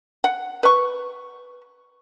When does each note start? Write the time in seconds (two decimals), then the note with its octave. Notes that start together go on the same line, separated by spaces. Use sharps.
0.24 F#5
0.63 B4 C#6